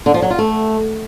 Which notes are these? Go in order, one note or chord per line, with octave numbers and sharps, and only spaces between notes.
D3
F3
F#3
F4
A3